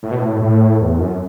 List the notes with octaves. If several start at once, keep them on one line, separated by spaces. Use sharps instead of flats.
A2
B2
A2
A2
E2
F#2